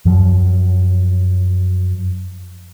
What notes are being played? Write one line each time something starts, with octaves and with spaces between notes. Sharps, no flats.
F#2 F3 F#3